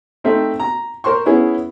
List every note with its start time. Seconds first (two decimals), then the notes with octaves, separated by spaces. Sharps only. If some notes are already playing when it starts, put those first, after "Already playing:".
0.24 A3 C4 D#4 A4 E5
0.60 A#5
1.04 A#4 C5 C6 C#6
1.26 B3 C#4 E4 G#4